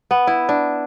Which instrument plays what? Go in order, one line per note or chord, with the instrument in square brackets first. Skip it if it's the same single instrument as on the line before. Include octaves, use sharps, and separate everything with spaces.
[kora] B3
E4
D4